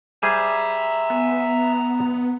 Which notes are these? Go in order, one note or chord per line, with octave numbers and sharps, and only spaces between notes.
G3 G#4 C5 E5 G#5 A#5
B3